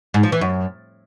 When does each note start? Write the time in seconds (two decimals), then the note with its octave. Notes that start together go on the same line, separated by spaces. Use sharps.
0.14 G#2
0.23 F3
0.32 E3
0.41 F#2